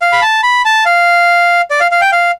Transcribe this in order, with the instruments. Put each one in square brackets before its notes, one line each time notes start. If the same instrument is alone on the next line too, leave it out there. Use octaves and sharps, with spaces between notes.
[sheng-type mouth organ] F5
B5
A5
B5
A5
F5
D5
F5
F5
G5
F5